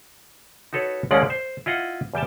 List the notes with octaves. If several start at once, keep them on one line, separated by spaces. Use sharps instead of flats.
D#4 F#4 A4 B4 C#5
D#2 G#3 A#3 C#4 D5 F#5
C5
E4 F4 D#5 F#5
E2 G3 G5 A5